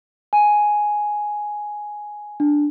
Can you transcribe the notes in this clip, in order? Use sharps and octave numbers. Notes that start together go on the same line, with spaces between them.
G#5
D4